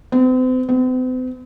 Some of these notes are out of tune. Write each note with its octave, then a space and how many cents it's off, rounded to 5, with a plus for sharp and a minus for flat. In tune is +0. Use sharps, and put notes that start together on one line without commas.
C4 -40
C4 -45